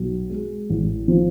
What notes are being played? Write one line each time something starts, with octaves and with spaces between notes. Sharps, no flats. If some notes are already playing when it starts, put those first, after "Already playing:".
Already playing: B1
G#3
A1
F3